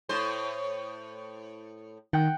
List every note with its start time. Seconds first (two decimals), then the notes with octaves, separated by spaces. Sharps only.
0.09 A2 C5
2.13 D#3 F#5 G5